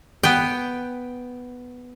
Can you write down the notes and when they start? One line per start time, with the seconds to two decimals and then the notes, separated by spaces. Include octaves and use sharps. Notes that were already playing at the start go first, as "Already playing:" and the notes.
0.23 B3 G5